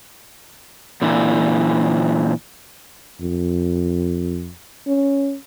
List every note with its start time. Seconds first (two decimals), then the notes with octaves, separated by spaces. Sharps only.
1.02 A#2 D3 E3
3.20 F2
4.87 C#4